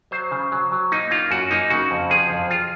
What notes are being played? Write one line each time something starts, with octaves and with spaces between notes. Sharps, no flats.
F#3 C5
C#3
F#3
F#3
A#3 D#4
A#3 F4
F#2 F#4
A#3 D#4
C#3 F#4
F2
F3 G#4
F2
F4